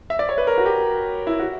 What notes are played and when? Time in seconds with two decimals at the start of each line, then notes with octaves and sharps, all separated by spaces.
0.10 E5
0.19 D5
0.29 C#5
0.38 B4
0.47 A#4
0.58 F#4
0.66 G4
1.27 E4
1.39 F#4